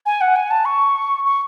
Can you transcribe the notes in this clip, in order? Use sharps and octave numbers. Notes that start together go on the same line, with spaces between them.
G#5
F#5
G#5
A5
C#6
C#6